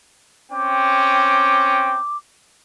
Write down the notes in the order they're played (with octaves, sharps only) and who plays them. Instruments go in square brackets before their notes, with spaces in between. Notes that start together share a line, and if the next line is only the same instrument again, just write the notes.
[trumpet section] C4 C#4 G5 [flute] D6